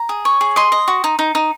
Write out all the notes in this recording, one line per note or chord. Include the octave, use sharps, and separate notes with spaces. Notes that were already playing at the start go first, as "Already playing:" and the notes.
Already playing: A#5
G#4
C#5
G#4
D#5 C6
D#5
F#4
D#4
D#4
D#4